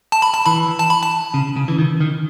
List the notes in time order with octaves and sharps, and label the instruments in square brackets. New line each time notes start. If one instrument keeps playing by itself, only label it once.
[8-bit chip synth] A5
B5
A5
[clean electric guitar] E3 [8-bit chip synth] B5
[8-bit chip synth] A5
B5
A5
[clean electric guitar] C#3
C#3
E3
D#3
D#3